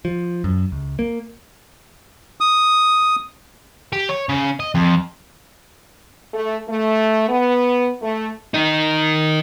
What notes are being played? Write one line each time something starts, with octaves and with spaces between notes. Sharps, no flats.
F3
F#2
C#2
A#3
D#6
G4
C#5
C#3
D#5
F2
A3
A3
B3
A3
D#3 D#4